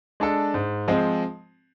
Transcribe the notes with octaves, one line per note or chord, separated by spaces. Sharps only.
G#3 D4 A4
G#2
F3 G#3 C4